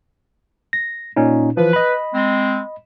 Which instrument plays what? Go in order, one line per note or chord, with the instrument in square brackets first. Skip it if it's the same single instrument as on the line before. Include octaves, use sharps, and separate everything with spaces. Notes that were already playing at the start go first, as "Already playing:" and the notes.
[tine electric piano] A#6
A#2 C#4 D#4
[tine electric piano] E3 F3 [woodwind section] B4
[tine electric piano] D#5 B5
[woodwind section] G#3 C4